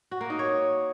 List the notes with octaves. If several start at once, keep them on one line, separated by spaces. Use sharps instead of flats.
F#4
A#3
D#4
C#5